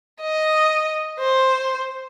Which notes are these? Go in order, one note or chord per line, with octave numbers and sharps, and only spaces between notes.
D#5
C5